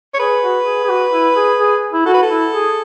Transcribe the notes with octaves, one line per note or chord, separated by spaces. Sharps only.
C#5
G#4 B4
F#4
G#4
G#4
F#4
E4
G#4
G#4
E4
F#4 A4
B4
A4
E4
G#4